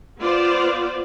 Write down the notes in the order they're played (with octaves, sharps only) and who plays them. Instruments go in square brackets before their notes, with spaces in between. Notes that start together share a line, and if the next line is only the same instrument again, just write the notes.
[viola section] B3 F4 C5 D5